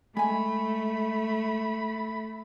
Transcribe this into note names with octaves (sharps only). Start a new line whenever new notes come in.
G#3 A3 G#5 B5